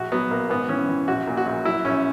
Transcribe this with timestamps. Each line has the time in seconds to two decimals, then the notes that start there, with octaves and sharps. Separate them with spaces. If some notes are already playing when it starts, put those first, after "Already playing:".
Already playing: A#1 F#4
0.12 F#3 B3
0.30 A#1 A#3
0.50 G#1 B3
0.69 E3 C#4
0.89 E3
1.08 A#1 F#4
1.27 A#2
1.37 F#4
1.46 A#1
1.65 F#3 E4
1.85 A#1 C#4